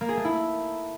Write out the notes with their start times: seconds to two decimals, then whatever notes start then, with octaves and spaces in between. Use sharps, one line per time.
0.01 A#3
0.09 G#4
0.17 A3
0.25 E4